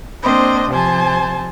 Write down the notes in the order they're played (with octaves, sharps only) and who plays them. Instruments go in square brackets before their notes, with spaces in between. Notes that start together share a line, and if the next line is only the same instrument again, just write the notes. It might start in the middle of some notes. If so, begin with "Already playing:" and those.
[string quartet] A#3 C4 D4 C5 D#5
C3 F3 C5 G#5 A5